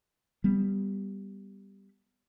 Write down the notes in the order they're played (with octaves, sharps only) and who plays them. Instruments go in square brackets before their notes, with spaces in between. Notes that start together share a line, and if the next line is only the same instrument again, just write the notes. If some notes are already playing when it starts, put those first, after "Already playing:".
[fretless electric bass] G3 B3